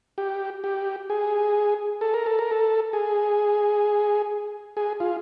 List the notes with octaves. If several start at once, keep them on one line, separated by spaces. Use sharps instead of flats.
G4
G4
G#4
A4
A#4
A4
A#4
A4
G#4
G#4
F4